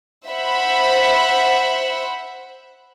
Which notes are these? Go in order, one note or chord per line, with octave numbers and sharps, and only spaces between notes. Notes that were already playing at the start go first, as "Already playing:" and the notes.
C5 E5 F#5 B5